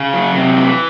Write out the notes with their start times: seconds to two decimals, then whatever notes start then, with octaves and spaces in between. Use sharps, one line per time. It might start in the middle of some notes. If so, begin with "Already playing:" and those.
Already playing: C#3
0.13 F#3
0.35 C3
0.57 E3